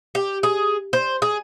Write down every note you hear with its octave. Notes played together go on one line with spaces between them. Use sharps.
G4
G#4
C5
G#4